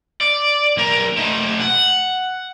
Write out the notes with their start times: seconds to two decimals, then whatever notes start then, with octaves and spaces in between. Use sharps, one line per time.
0.21 D5
0.77 B1 A#4
1.17 A3 D#4
1.60 F#5